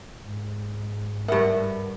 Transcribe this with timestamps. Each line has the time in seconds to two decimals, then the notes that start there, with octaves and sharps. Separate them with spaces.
0.21 G#2
1.28 G2 A#4 E5 F#5